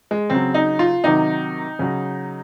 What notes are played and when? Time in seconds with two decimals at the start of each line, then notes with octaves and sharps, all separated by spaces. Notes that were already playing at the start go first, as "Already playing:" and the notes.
0.11 G#3
0.30 C#3 F#3 C4
0.54 D#4
0.79 F4
1.04 C3 D#3 F#3 D#4
1.79 C#3 F#3